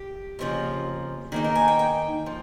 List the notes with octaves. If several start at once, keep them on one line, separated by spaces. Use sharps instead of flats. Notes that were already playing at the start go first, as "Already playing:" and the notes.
Already playing: G4
F2 C#3 F3 A#3
D#3 A#3 D#4 G#4
A#4
G#5
G5
G5
F3